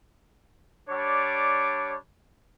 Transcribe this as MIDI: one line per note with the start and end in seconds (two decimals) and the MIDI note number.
0.89 1.95 55
0.89 1.95 62
0.89 1.95 73
0.89 1.95 86